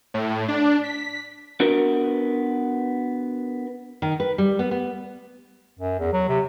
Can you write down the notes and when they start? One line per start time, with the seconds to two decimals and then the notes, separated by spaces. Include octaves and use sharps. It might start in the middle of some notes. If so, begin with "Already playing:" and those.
0.14 A2
0.48 D4
0.84 B6
1.60 B3 D4 F#4 A#4 B4
4.02 D#3
4.20 B4
4.38 G3
4.59 B3
4.71 B3
5.79 F#2
5.99 E2
6.13 F#3
6.29 C3